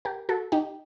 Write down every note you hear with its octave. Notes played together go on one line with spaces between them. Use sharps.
G4 A#4
F#4 A4
D#4 G4